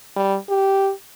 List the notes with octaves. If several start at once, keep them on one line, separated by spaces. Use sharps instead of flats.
G3
G4